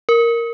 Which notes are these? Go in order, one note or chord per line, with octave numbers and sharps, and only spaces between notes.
A#4